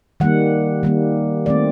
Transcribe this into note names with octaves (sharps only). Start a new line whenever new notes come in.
D#3 G3 A#3 F#5
D#3 G3 A#3
D#3 A3 C4 D5